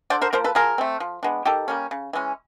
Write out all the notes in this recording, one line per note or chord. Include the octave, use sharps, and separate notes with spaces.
D3 C5 D5
A#4 C5
F3 A#3 A#4 C5
A4 B4
F3 G#4 A#4
A3 C4
F3
G#3 B3 D4
D#3 G4 A4
G3 A#3 C#4
C#3
E3 G#3 C#4